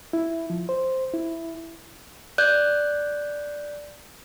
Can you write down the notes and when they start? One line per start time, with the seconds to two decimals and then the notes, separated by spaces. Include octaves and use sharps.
0.13 E4
0.50 F3
0.69 C5
1.14 E4
2.38 D5 F#6 G6